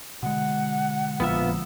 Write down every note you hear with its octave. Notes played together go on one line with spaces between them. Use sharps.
B2 D3 G#3 F#5
A#1 B3 F4 E5